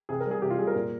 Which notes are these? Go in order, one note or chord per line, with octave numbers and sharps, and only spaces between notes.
C3 G#4
A#4
G3
G#4
C3 G4
F4
G3 G#4
A#4
A#2